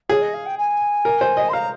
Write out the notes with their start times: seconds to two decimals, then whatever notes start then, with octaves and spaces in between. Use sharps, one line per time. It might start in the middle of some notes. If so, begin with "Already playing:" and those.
0.09 G#4 C#5
0.21 D#5
0.34 F5
0.46 G5
0.58 G#5
1.05 A#4
1.21 C5
1.37 D#5
1.49 C6
1.53 F5 A#5